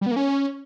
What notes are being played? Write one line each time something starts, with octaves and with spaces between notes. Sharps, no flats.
G3
B3
A#3
C#4